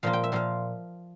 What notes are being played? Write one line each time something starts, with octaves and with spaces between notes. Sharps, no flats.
A#2 F3 A#3 F4 F5
G5
E5
A#2 F3 A#3 F4 F5